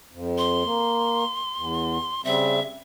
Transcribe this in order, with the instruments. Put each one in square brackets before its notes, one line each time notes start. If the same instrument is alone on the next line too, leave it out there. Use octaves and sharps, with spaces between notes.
[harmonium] F2
[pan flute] C6
[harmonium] A#3
E2
[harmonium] C#3 G3 C4 [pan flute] E5